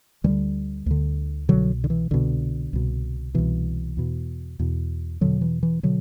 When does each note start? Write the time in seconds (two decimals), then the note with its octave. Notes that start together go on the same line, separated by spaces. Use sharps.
0.24 D2 E3 G3
0.29 D3
0.86 D2 D3
1.49 C2 B2 D3 F#3
1.84 D3
1.90 E3
2.11 C2 B2 D3
2.73 C2 B2
3.34 C2 B2 E3
3.97 E2 B2
4.59 E2 B2
5.21 E2 B2 D3 F#3
5.41 E3
5.63 E3
5.83 B2 D3 F#3